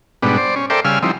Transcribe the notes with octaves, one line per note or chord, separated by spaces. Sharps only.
G#2 B2 G3 B3 D4
C5 D5
C#4
A4 A#4 C5 D5 E5 G5
C#3 G3 F5 G#5 E6 F6
F3 G3 C4 D#4 E4